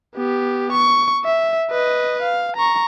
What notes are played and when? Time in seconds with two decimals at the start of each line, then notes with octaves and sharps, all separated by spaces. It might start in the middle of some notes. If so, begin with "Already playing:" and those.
0.15 B3 G4
0.72 C#6
1.24 E5
1.71 B4 D#5
2.22 F5
2.57 A#5 C#6